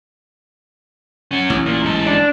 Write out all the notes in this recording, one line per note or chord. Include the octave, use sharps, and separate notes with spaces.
C#4 F#5
A1
A#2
G#2 A4
D4